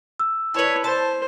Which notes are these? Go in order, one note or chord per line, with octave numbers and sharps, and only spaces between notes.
E6
E4 B4 C#5 A5
C5 A5